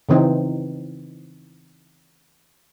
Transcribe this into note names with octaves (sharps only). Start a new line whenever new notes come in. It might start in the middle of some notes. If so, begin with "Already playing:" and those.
C#3 E3 C4 D#4